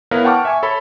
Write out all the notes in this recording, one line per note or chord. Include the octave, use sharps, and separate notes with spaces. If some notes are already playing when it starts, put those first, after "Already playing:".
B3 E4 A#4 B4 C#5 F5
F#5 G5 A5 C#6 D6 F6
E5 G#5 C#6
A4 C#5 B5